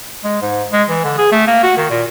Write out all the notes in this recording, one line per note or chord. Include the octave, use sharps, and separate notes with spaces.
G#3
G#2
G#3
E3
D3
G#4
A3
A#3
F#4
D#3
A#2